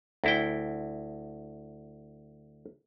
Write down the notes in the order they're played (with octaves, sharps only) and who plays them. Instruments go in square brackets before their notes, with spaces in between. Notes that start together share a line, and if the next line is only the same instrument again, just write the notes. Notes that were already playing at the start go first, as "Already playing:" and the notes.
[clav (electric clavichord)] D2 E4 G5